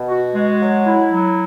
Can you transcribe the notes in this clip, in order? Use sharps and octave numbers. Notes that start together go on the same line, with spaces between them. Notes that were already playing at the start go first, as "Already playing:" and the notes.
Already playing: B2
F#4
G#3
F#3
E4
F#3